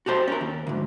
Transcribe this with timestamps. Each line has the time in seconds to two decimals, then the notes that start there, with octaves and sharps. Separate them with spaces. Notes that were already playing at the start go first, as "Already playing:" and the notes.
0.06 F#4 G4 A4 C5
0.28 C#4 G4 A#4
0.41 D#2
0.67 D2 G#2